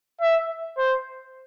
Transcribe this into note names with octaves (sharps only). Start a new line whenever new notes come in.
E5
C5